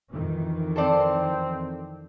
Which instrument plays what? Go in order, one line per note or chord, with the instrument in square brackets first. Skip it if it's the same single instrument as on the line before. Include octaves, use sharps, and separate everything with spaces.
[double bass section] F2 D#3 E3
[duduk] C4 [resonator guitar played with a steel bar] A4 C5 D5